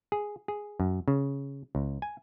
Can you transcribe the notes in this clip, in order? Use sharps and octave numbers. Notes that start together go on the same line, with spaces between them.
G#4
G#4
F#2
C#3
C#2
G#5